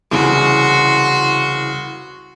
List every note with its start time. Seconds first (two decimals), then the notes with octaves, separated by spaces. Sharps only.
0.11 C2 C#3 E3 F#4 C6